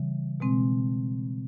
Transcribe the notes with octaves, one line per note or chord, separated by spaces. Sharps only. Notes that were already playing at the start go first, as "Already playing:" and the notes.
Already playing: C#3 E3 G3
B2 G#3 C4